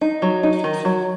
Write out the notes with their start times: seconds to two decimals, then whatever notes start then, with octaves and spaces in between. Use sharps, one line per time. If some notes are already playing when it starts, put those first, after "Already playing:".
0.01 D#4
0.22 F#3
0.43 D#4
0.64 D#3
0.85 F#3